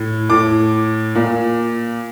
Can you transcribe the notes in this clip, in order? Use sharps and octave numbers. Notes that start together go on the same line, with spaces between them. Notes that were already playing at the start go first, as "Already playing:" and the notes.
Already playing: A2
A2 D6
A#2